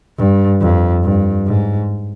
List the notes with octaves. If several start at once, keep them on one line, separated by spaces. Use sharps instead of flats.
G2
F2
G2
G#2